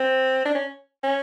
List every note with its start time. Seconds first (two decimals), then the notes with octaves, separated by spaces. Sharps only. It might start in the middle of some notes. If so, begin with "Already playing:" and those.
Already playing: C4
0.45 D4
0.55 C#4
1.03 C#4